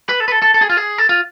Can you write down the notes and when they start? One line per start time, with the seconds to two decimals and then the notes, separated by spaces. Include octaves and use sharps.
0.09 B4
0.20 A4
0.28 B4
0.32 A4
0.42 A4
0.54 A4
0.61 G#4
0.70 F4
0.77 G#4
0.98 A4
1.09 F4